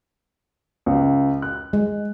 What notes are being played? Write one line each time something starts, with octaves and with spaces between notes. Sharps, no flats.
C#2
F#6
G#3